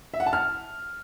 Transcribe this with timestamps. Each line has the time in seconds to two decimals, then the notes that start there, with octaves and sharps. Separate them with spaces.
0.14 E5
0.20 F#5
0.26 A5
0.33 F6